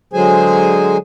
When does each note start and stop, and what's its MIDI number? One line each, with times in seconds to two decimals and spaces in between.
0.13 0.97 50
0.13 0.97 54
0.13 0.97 56
0.13 0.97 68
0.13 0.97 72
0.13 0.97 80